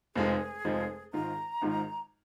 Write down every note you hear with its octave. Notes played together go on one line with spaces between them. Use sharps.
F1 F2 F3 G#3 D#4 G#4
F1 F2 F3 G#3 D#4
G#1 G#2 D#3 G#3 F4 A#5
G#1 G#2 D#3 G#3 F4